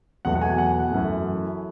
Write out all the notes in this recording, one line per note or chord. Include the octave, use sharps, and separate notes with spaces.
E2 B2 F#3 A3 F#5
F#5
G#5
F#5
F#2 E3 A3